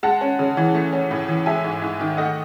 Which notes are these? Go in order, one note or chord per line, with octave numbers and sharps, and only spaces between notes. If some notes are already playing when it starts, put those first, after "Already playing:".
G#3 F#5 A5
C#4
C#3
E3
A3
C#4
A2
E3
G#3 E5 G#5
G#2
G#2
D#3
A3 D#5 F#5